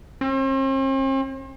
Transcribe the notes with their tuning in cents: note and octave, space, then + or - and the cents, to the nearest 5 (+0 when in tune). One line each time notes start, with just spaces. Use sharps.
C4 +45